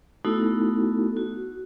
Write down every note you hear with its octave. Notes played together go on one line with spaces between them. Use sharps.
A3 B3 D#4 E4 F#4 A4
F#4